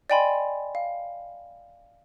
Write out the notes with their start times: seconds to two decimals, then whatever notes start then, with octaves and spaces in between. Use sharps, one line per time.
0.10 D5 D#5 G5 G#5 B5 C6
0.75 F5